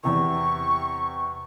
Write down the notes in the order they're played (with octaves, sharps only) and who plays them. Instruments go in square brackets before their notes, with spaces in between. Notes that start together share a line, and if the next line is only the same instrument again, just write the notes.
[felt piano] E2 C3 E3 [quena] C#6